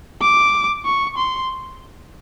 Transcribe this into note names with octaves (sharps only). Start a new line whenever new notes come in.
D6
C#6
C6